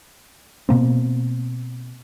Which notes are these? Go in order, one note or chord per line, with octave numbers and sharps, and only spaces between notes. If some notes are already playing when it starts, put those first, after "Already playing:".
B2 A#3 C4